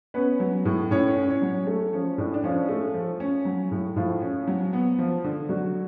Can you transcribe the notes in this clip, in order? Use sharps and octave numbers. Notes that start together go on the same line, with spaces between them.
B3 C#4 B4
F#3
A2
A2 C#4 C#5
C#4
C#4 C#5
F#3
A3 A4
F3 C#4
A2 D4
D4
F3 C#4 F4
A3
F3
C#4
F#3
A2
A2 F3 F4
C#4
F#3
B3
F3
D3
D3 F#3 F#4